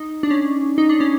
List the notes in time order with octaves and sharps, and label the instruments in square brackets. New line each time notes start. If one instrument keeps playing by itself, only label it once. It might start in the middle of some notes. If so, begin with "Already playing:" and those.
Already playing: [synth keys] D#4
D4
C#4
D#4
D4
C#4